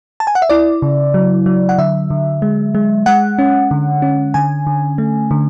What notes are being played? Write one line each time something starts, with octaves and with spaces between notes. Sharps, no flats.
A5
G#5
F#5
E5
E4 D5
C#3
F#3
F#3
F#5
D3 E5
D3
G#3
G#3
G#3 F#5
C#4
D3
C#4
D3 G#5
D3
A3
D3